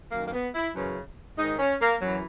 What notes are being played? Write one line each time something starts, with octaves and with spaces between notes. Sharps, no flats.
F#2 D#3 A#3
A#3
B3
E4
F#2 C#3 E3
G#2 D#3 D#4
C#4
A#3
F#2 E3 F#3